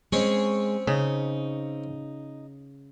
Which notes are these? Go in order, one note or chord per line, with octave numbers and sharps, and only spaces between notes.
G#3 C4 C#4 C#5
C#3 D#4